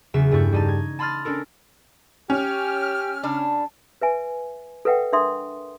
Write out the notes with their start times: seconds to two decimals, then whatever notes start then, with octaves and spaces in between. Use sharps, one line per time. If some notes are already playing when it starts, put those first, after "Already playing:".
0.14 E2 C#3 F#3 E5 C#6 E7
0.31 G2 A3 E4 C#6 G6
0.52 G3 D#4 A5
0.68 G#6
0.99 A5 B5 C6 D#6 F6 A6
1.25 C#4 D4 A4 A#4
2.30 C#4 G4 F6
3.23 C#3 D4
4.01 B4 E5 G#5
4.85 A4 B4 E5 F#5 G5
5.13 D4 A#4 E5 C6 D#6